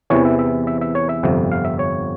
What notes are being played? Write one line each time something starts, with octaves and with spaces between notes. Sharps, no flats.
E2 C3 E3 C#5
E5
E5
E5
E5
C#5
E5
G1 F2 C3
F5
E5
C#5